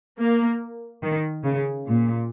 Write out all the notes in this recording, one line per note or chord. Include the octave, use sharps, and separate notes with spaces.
A#3
D#3
C#3
A#2